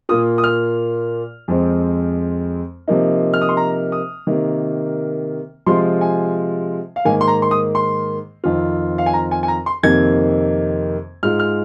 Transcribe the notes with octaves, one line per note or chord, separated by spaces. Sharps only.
A#2 A#3 F4 D#6
D#6
F6
F2 F3 G#3 C4
C3 F3 A#3 D#4
F6
D#6
C6
A#5
D#6
C3 D#3 A#3
C3 F3 G#3 F4 C6
G#5
F5
G#2 D#3 A#3 G#5
C6
A#5
C6
D#6
C6
F2 D#3 C4 F4
F5
G#5
A#5
G#5
G#5
A#5
C6
F2 C3 D#3 A#3 D#4 G#6
G#2 G#3 F4 F6
F6